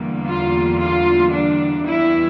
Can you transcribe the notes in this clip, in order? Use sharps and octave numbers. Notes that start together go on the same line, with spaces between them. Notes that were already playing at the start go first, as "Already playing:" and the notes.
Already playing: E2 D3 G3 A#3
F4
F4
D4
E2 E3 G3 E4